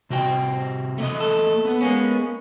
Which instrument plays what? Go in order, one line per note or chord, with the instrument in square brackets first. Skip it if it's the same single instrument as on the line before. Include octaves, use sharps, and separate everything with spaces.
[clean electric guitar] C2 G5 [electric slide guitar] C3 F#4
[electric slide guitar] A3 A#3 D#5
[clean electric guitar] A4
[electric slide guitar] B3 B4
[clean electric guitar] G#3 A#3 C#4